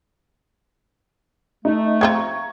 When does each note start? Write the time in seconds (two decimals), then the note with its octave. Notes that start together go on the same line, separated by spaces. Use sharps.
1.65 A3 D#4
2.01 F3 C4 F4 A#5 C#6 G#6